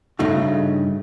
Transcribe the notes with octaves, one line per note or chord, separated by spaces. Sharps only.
G2 C#3 A3 D#4 F#4